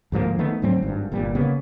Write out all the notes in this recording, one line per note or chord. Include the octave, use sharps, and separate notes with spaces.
D2 G#2 F3 A#3
D#3 A3 B3
D2 G#2 F#3 C4
G#1 G2
G1 A#2 G3
C#3 A#3 B3